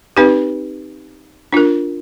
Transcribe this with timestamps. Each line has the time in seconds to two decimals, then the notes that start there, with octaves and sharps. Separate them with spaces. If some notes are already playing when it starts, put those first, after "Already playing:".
0.17 C4 D#4 G4 B4
1.53 D4 F4 A#4